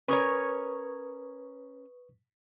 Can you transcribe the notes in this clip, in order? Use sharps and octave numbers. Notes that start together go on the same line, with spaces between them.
C#4 A#4 B4 C#5 C#6 D#6